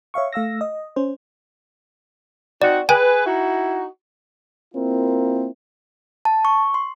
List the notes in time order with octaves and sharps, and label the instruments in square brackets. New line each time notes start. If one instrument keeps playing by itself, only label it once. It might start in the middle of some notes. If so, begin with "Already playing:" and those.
[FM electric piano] C#5 E5 F5 C#6
A3 F5 E6 A#6
D#5
C#4 C5
[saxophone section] C4 D#4 F#4 [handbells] D5
[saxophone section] G#4 B4 [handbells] G5 G#5
[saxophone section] D#4 E4 F#4
[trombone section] A#3 C4 E4 F4 A#4
[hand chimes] A5
C#6
C6